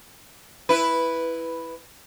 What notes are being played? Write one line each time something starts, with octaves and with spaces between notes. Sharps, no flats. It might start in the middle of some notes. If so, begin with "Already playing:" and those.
E4 B4